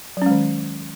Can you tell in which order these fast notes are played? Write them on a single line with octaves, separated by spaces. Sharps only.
F#3 C#4 G#3 D#3